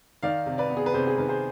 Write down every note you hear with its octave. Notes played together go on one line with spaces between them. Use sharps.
D#3 D5 F5
C3
B4 D5
B3
G#4
B4
C3 G#4 C5
G#4
D#3 B4
G#4 C5